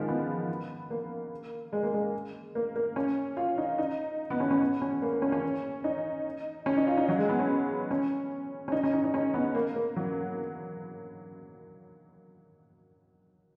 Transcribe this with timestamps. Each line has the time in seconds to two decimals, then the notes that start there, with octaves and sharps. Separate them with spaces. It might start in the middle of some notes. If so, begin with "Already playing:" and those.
Already playing: D#3 F3 G#3
0.08 B3
0.90 A#3
1.73 G#3
1.83 A#3
1.94 G#3
2.55 A#3
2.76 A#3
2.96 C#4
3.37 F4
3.58 D#4
3.78 D#4
4.30 B3
4.40 C#4
4.51 C#4
4.61 B3
4.82 C#4
5.02 A#3
5.12 A#3
5.22 C#4
5.32 C#4
5.84 D#4
6.66 C#4
6.77 D#4
6.87 F4
6.97 D#4
7.08 F#3
7.19 G#3
7.29 B3
7.39 C#4
7.91 C#4
8.68 C#4
8.72 D#4
8.83 C#4
8.93 D#4
9.04 D#4
9.14 C#4
9.34 B3
9.55 A#3
9.76 A#3
9.96 F#3